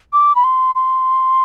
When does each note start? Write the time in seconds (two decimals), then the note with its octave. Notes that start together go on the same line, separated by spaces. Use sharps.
0.13 D6
0.35 B5
0.44 C6
0.75 C6